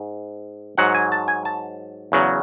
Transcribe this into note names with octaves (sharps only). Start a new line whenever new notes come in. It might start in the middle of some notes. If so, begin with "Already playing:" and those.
Already playing: G#2
G#2 F#3 F#5
G#5
A5
G#5
A5
E2 C#3 F#3